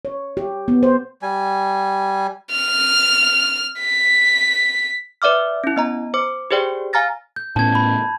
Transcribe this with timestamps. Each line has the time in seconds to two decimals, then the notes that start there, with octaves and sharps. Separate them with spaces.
0.05 C#5
0.37 G4
0.68 B3
0.83 C5
1.22 G3 G#5
2.51 F6
3.80 B6
5.22 B4 D5 E5 D6 F6
5.64 C#4 E4
5.76 B3 D#5 A#5
6.14 C5 D6
6.51 G4 G#4 C5 D5 G5
6.93 F5 G#5 A#5 F6 A6 A#6
7.36 G6
7.56 A2 B3 C#4 A5 G#6
7.75 B5